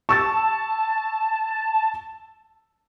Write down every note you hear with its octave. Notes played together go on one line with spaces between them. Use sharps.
A5 C#6 E6 A6